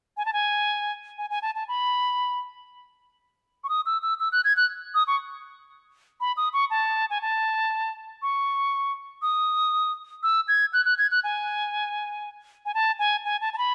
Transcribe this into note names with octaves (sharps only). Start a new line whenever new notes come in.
G#5
A5
G#5
G#5
G#5
A5
A5
B5
C#6
D#6
E6
E6
E6
F#6
G#6
F#6
D#6
C#6
B5
D#6
C#6
A5
G#5
A5
C#6
D#6
E6
G#6
F#6
F#6
G#6
F#6
G#5
G#5
A5
G#5
G#5
A5
A5
B5